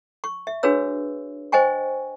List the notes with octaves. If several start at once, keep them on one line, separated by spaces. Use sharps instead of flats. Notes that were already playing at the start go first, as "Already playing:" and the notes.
C#6
E5
D4 F#4 G#4 B4 C#5 E6
C5 D#5 G5 G#5 C#6